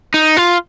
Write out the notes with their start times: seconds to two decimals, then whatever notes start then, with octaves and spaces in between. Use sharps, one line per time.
0.14 D#4
0.37 F4